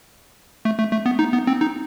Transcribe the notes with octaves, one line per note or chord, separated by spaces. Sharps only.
A3
A3
A3
B3
D#4
B3
C4
D#4